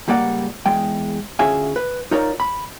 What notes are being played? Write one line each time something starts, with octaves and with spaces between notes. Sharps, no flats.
C#2 G3 A#3 D5 F#5
E2 G#3 G5
D2 C#4 F4 G#4 E5 G#5
B4
D#4 F4 A#4 C#5 D5
B5